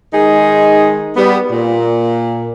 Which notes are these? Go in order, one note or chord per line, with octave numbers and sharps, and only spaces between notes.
D#3 G#3 D#4 G#4
G3 B3
A#2